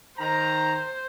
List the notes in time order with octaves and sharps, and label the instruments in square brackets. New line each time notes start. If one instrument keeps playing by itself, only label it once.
[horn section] D#3 A#5 [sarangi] C5